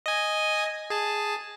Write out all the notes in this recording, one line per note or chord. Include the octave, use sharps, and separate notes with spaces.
D#5 G#5
G#4 A5